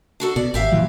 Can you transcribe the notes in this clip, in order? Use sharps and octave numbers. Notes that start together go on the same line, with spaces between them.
D4 F#4 A4
B2 D5
G#1 G4 E5 F5
A#2 E3 F#3